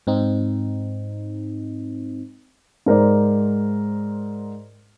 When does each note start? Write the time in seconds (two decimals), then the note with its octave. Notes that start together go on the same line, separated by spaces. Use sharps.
0.07 G#2 C4 D#4
2.86 G#2 A#4 C5 D5